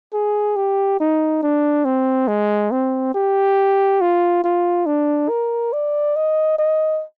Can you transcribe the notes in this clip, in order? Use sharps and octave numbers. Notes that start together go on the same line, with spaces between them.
G#4
G4
D#4
D4
C4
G#3
C4
G4
F4
F4
D4
A#4
D5
D#5
D#5